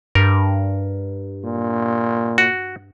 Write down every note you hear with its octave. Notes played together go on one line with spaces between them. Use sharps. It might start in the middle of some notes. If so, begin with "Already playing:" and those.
G2 A#4
A#2
F#4